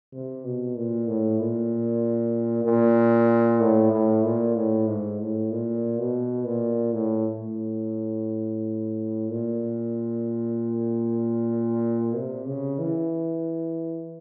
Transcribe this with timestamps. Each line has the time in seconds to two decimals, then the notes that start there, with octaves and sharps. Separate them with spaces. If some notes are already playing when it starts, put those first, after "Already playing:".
0.13 C3
0.45 B2
0.75 A#2
1.07 A2
1.40 A#2
2.65 A#2
3.60 A2
3.92 A2
4.24 A#2
4.56 A2
4.87 G#2
5.19 A2
5.51 A#2
5.99 B2
6.45 A#2
6.93 A2
7.40 A2
9.30 A#2
12.16 C3
12.47 C#3
12.79 E3